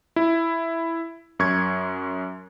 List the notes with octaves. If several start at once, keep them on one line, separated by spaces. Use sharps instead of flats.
E4
F#2 C#6 G#6